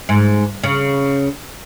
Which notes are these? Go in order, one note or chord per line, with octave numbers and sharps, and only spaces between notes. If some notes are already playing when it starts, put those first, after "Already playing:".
G#2
C#3